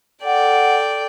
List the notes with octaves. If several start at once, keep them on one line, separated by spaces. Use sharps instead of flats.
A4 D5 F#5 G5